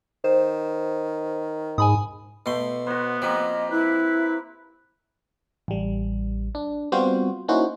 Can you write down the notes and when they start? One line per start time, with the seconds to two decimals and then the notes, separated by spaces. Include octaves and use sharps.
0.24 D#3 C5
1.78 G#2 G#5 B5 D#6
2.46 B2 A3 C6
2.87 B3 F#4 C5
3.22 F3 A#3 C4 G4 D#5
3.71 E4 B4
5.68 A1 G3
6.55 D4
6.92 G3 B3 C4 F4 F#4 C5
7.48 A#3 C#4 D#4 E4 F#4 C5